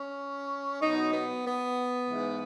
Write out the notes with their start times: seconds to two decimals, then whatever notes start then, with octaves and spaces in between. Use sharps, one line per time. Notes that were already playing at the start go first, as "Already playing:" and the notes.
Already playing: C#4
0.81 B2 F#3 D#4
1.12 B3
1.45 B3
2.09 G#2 E3